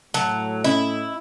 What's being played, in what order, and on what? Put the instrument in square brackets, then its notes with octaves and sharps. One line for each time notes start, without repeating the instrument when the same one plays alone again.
[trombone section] A2 [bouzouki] F#3 [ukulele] A5
[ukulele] C#4 [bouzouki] E4 [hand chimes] D#5